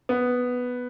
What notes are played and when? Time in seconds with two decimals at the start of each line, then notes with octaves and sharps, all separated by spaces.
0.09 B3